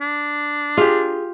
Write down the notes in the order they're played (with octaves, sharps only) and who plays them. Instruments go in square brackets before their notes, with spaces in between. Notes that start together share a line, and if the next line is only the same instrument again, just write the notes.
[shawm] D4
[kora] F4 G4 [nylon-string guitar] G#4